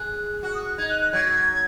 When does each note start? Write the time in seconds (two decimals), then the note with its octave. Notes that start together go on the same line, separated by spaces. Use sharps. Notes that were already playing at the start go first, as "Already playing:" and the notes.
Already playing: G#4 F#6
0.43 F#4 F#6
0.55 D#6
0.65 F#6
0.78 D#4 G#6
0.89 F#6
1.02 F#6
1.13 F#3 G#6